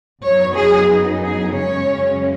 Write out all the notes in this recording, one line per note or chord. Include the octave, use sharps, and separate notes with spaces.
F#2 F#3 B3 D#4 C#5
G#4
G#4
F#2 C#3 G#3 C#4 C#5